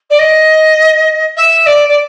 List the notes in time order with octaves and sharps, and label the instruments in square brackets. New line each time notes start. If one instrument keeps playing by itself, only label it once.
[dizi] D5
D#5
E5
D5
D5